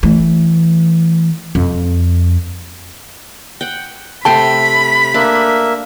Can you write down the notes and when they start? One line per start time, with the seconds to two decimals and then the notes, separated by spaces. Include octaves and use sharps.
0.03 E3 A3
1.55 F2
3.61 F#5 G5
4.25 C3 A3 G5 A5 B5 C6
5.14 A#3 D4 E5